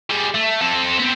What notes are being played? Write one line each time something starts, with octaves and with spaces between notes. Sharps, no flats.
G3 G#4
A3
C4 A4
B3 C4